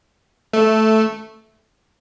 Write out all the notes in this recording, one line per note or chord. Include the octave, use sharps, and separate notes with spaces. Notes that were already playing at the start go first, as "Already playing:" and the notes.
A3